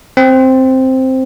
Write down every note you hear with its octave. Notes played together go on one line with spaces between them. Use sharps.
C4